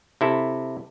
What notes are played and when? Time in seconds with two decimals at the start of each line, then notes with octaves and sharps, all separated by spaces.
0.21 C3 E4 A4